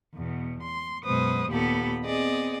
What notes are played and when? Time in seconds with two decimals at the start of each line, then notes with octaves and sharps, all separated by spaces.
0.15 E2 B2
0.62 C6
1.04 F#2 B2 G#3 B4 C5 D#6
1.49 D#2 A#2 B3 G4 A4 B5
2.05 B3 C4 G#4 D5 D#5